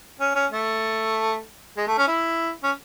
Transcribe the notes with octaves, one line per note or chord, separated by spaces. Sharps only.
C#4
C#4
A3
G#3
A3
C#4
E4
C#4